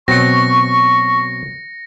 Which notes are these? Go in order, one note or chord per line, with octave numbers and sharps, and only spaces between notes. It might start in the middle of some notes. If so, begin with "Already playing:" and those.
B2 F#3 C4 C#6 A#6 C#7